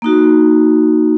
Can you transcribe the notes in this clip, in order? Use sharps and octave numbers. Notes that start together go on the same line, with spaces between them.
A#3 D#4 F#4